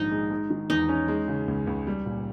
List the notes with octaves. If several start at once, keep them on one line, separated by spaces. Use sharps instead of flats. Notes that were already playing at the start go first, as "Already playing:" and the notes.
Already playing: A#1 G#2 D#3 D#4
G#3
G#3
D#3
E2 D#4
C#4
G#3
C#3
C#2
C#2
G3
A#2